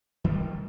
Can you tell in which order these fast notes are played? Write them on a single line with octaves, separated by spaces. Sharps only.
D#3 G3 A3